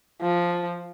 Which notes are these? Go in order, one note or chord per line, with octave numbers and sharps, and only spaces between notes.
F3